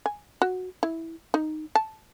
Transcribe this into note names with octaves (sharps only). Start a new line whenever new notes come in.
G#5
F#4
E4
D#4
A5